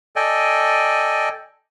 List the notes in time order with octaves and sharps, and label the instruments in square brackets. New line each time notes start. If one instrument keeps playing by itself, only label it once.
[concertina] A4 D5 D#5 G5 G#5